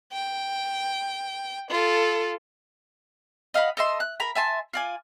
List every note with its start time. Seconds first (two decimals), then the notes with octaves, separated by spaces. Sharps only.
0.12 G5
1.70 F4 A4
3.54 D#5 F5 F#5 B5
3.77 A4 D#5 E5 C6
4.00 F#6
4.20 A#4 A#5 B5
4.35 E5 G#5 A5 C6
4.73 F4 D5 G#5